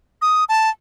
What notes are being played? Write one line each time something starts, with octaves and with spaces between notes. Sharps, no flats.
D#6
A5